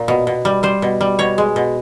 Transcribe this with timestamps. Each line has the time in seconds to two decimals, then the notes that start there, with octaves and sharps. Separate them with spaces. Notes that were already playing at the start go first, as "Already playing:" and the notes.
Already playing: A#2
0.08 B2
0.27 B2
0.45 G3
0.63 G3 C5
0.82 B2
1.01 G3
1.19 B2 C#5
1.38 G#3
1.56 B2